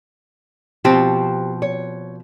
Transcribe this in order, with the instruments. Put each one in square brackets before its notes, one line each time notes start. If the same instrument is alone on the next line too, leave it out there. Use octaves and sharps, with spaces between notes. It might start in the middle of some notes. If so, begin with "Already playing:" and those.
[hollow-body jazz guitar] B2 F3 C4 [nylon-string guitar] G4
[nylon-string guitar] C#5